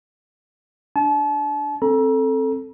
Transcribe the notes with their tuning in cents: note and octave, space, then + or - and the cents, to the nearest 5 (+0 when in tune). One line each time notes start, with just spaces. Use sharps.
D4 +0 A5 -40
C4 +15 A4 +0 A#5 +35